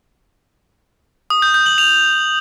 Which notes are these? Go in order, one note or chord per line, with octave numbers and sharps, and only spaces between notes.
D#6
G6
G6
F#7
F7